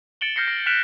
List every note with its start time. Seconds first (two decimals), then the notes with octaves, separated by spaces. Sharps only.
0.21 A6 C#7 D7 E7 F#7 G7
0.36 F6 G6 A#6 C7 C#7
0.48 A#6
0.66 F6 F#6 B6 D7 E7 F7